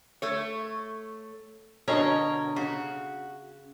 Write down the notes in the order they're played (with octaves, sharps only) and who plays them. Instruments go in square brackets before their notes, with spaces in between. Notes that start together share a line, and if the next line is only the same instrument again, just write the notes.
[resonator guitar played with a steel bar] A3 C#5
[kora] B2 D3 C#4 [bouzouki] A#4 C#5 D#5
[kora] C#3 [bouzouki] F#4